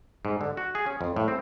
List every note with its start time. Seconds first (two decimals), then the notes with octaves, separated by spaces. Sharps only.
0.25 G#2
0.41 D3
0.57 F#4
0.75 G#4
0.86 C#4
1.01 F2
1.16 A2
1.28 C4